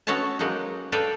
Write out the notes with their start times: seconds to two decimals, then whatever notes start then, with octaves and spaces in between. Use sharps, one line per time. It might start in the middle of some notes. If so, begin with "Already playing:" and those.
0.07 B3 C#4 F#4 C#5 E5 A5
0.39 F#3 G#3 A#3 D#4 F#4
0.92 A4 B4 D5 E5 F5 G5